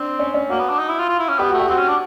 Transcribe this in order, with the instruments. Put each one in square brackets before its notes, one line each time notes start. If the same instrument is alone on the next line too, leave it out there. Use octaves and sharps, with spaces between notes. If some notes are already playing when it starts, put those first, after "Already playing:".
Already playing: [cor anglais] C4 [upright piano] D4
[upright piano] C#4
C#4
[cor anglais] A#3 [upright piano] F#4
[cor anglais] B3
D4
D#4
E4
F4
F4
E4
C#4
[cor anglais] B3 [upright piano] G4
[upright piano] F#4
[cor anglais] A3
[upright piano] G4
[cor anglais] C4 [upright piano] F#4
[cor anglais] C#4
D4